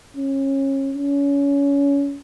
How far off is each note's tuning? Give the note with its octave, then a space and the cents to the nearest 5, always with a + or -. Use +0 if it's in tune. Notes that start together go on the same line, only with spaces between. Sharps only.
C#4 -30
C#4 +25